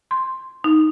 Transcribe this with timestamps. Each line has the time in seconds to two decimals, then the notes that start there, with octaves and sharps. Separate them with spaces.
0.11 C6
0.64 D#4